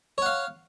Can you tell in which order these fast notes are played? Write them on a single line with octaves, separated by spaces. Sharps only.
C#5 F#5 F5